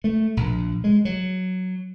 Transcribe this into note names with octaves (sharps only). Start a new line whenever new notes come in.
A3
A#1
G#3
F#3